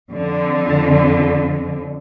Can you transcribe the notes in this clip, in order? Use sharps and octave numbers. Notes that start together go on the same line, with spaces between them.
F2 D3